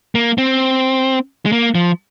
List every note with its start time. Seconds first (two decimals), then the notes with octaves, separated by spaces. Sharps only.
0.15 A#3
0.38 C4
1.46 G#3
1.52 A#3
1.75 F3